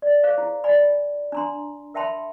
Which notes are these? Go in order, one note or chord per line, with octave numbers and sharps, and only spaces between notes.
D5
G#4 C5 F5
E4
D5 G#5 B5
D4 A#5 C6
A#4 E5 G5 A5 B5 C6